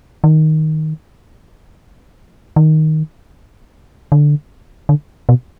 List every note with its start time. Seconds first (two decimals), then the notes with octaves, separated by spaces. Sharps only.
0.24 D#3
2.56 D#3
4.12 D3
4.89 D3
5.29 B2